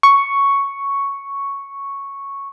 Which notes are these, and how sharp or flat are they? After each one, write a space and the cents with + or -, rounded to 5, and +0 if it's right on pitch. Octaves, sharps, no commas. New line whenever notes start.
C#6 +0